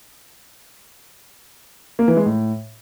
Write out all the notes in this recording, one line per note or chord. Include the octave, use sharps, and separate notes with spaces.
A#3
E3
G#3
A2